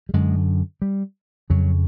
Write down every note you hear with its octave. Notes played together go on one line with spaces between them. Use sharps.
G3
F#2 D3 G#3
G3
F2 C#3 F#3